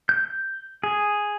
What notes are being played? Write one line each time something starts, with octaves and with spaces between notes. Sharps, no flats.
G6
G#4